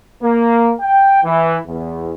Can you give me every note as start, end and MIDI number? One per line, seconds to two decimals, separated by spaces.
0.23 0.71 58
0.80 1.20 79
1.24 1.57 52
1.66 2.15 40